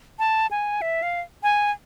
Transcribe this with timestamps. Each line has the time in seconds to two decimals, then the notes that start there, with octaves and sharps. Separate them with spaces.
0.19 A5
0.51 G#5
0.82 E5
1.02 F5
1.43 G#5